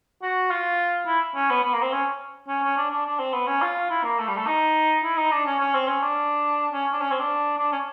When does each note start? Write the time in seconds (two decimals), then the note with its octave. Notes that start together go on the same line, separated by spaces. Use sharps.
0.23 F#4
0.51 F4
1.07 E4
1.35 C#4
1.50 B3
1.64 B3
1.74 A#3
1.82 C4
1.92 C#4
2.48 C#4
2.63 C#4
2.77 D4
2.91 D4
3.06 D4
3.19 C4
3.33 B3
3.47 C#4
3.62 F4
3.90 E4
4.04 A#3
4.19 A3
4.28 G3
4.37 A3
4.47 D#4
5.04 E4
5.17 D#4
5.32 D4
5.46 C#4
5.60 C#4
5.74 C4
5.88 C#4
6.03 D4
6.73 C#4
6.93 D4
7.01 C#4
7.11 C4
7.20 D4
7.58 D4
7.72 C#4